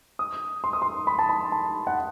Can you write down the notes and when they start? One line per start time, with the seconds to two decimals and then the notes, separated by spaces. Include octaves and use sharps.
0.19 D#6
0.64 C6
0.73 D#6
0.82 C6
1.07 B5
1.19 A5
1.29 B5
1.52 A5
1.87 F#5